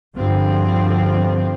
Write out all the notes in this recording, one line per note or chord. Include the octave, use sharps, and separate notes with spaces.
G2 D3 F3 C4